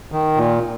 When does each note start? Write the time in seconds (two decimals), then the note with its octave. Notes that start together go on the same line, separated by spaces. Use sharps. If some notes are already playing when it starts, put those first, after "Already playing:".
0.12 D#3
0.37 A#2